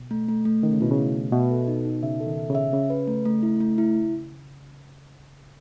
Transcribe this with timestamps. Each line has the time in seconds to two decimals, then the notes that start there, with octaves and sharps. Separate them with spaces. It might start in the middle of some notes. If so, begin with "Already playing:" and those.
Already playing: B2
0.11 A3
0.28 A3
0.45 A3
0.63 D#3 C#4
0.73 C#3
0.81 B2 E4
0.91 C#3
0.98 A3
1.16 A3
1.33 B2 E5
1.51 A4
1.67 D#4
1.85 D#4
2.03 C#3 E5
2.20 A4
2.26 D#3
2.38 E5
2.50 C#3
2.55 E5
2.73 C#3 C#4
2.90 B4
3.07 A3
3.25 A3
3.43 E4
3.60 A3
3.78 E4